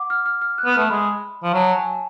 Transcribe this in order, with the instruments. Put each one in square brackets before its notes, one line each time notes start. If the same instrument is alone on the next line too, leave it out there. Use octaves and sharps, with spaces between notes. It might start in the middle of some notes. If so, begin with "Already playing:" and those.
Already playing: [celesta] F#5 D6
F6
F6
F6
F#6
[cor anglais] B3
[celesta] F6
[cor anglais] A3
[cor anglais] G#3 [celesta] B5
[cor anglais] F3
[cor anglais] F#3 [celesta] A5
[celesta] G#5